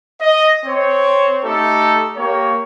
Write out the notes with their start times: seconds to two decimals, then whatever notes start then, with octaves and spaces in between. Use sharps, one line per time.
0.21 D#5
0.65 C4 C5 C#5
1.45 A3 D#4 G4 A4
2.16 A#3 G4 C#5